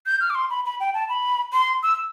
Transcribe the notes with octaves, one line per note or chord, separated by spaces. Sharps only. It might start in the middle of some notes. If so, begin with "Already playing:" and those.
G6
F6
D6
C6
B5
B5
G5
A5
B5
C6
E6